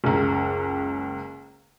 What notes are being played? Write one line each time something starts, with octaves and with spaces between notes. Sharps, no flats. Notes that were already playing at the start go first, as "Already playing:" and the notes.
F#1 C#2